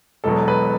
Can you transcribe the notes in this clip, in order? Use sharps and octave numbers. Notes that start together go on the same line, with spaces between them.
E1 E2 B2 F#3 A4
B4